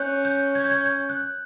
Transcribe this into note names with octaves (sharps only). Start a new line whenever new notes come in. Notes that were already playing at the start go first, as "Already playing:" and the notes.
Already playing: C#4 F#6 G6
G6
G#6
G6
G#6
G6
F#6